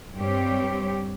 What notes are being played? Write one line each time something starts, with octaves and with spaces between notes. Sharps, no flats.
G2 G3 C4 G4 C#5